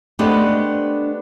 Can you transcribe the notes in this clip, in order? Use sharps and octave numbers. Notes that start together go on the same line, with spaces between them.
A3 B3 D4 G4 C5 D#5